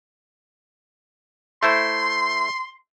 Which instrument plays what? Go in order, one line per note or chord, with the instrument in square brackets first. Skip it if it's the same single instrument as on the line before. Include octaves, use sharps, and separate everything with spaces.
[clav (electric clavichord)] A3 E4 C5 [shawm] C6